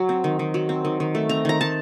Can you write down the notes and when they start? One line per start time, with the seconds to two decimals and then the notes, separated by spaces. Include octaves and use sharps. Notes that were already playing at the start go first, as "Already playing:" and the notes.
Already playing: F#3
0.09 C4
0.24 D#3
0.39 D#3
0.54 F#3
0.69 C4
0.85 D#3
1.00 D#3
1.15 A3
1.29 C4 A#5
1.45 D#3 A#5
1.61 D#3 A5